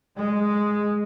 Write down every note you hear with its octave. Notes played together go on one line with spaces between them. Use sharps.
G#3